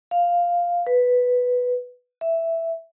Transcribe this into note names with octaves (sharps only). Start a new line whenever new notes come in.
F5
B4
E5